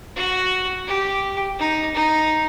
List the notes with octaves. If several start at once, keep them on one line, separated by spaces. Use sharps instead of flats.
F#4
G4
D#4
D#4